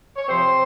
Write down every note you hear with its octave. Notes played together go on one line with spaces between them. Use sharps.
C#5
C3 F3 C4 C5